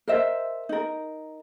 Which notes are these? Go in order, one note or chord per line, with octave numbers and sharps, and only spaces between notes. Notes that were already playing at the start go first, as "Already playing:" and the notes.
A#4 C5 D#5 E5
D#4 A#4